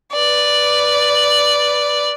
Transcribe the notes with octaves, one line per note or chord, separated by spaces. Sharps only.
B4 D5